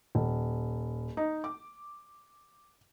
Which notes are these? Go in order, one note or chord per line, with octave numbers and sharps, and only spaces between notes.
D#1
D#4
D6